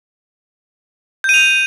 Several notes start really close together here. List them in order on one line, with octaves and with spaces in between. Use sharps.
G6 D#7 F7